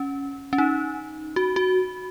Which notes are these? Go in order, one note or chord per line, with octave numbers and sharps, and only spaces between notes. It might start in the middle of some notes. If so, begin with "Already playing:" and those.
Already playing: C#4
C#4
D#4
F#4
F#4